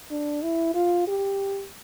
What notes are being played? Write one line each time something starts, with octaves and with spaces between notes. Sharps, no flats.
D4
E4
F4
G4